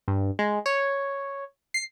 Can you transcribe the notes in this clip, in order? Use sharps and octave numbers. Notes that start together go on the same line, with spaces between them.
G2
G#3
C#5
C7